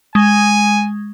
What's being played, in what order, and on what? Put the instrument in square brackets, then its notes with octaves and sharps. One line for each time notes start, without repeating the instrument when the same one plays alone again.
[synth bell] G#3 [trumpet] G#5